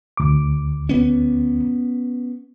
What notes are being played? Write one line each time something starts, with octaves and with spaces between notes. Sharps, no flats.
D2 D6
B3 C#4